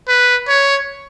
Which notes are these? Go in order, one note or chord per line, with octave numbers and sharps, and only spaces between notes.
B4
C#5